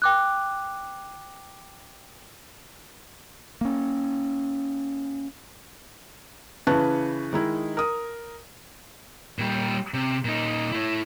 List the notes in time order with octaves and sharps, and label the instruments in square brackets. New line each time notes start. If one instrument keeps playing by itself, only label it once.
[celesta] G5 D6 F#6
[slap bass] A#3 C#4
[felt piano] C#3 E3 B4 A5 C#6 F#6
D#3 G#3 D#4 E4
A#4 D#6
[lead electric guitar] A#2 G3
C3
A#2 D#4
A3 E4